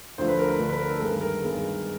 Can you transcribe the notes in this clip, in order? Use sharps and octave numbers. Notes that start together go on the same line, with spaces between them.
D2 D3 F3 A3 C5
B4
A#4
B4
D2 D3 F3 A3
B4
A#4
A4
G2 D#3 G#3 B3 A#4
A#4
G2 D#3 G#3 B3